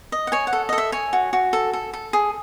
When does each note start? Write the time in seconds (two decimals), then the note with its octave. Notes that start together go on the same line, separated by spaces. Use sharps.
0.12 D#5
0.27 F#5
0.32 C#5 G#5
0.47 F#5
0.53 A4
0.69 A4 D#5
0.78 E5
0.92 C#5 G#5
1.13 F#4
1.33 F#4
1.53 A4
1.73 A4
1.93 A4
2.13 G#4